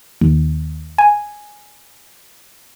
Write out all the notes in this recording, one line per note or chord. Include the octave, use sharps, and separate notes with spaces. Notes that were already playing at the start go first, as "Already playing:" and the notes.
D#2
G#5